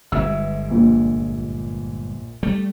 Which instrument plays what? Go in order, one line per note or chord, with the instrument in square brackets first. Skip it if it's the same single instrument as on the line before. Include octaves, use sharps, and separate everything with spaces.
[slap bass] G1 G#2 [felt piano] E5 E6
[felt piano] A#1 A#2
[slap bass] G3 A3